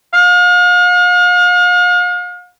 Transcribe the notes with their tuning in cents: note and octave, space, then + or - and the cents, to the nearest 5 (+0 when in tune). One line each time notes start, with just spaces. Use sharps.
F5 +40